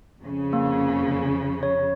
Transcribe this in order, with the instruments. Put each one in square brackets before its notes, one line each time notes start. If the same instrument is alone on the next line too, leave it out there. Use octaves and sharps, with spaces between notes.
[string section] F2 C#3
[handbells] A#3
C#5